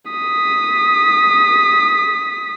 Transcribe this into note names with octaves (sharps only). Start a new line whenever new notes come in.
D#6 B6